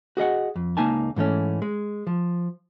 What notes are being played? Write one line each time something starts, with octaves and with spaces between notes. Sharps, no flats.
F#4 G#4 D#5 F#5
F2
C#2 F#3 A#3 D#4 G#5 A5
G#2 E3 A3 C#4
G#3
F3